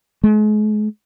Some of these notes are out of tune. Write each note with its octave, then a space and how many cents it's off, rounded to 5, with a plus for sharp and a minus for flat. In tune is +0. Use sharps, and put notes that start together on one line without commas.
G#3 +40